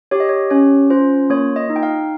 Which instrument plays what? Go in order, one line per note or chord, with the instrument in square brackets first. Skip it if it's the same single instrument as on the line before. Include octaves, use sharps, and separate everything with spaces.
[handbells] G4 C#5
D#5
C#5
C#4 C#5
F4 C5
A#3 C#5
D#5
D#4
G5
F5